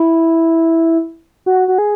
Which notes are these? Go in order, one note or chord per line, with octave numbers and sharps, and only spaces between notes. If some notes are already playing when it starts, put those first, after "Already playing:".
Already playing: E4
F#4
F#4
G#4